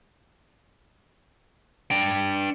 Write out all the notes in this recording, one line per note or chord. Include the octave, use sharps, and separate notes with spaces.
D4 G5